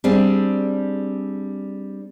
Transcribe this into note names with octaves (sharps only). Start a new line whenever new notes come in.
G3 C4 D4 G#4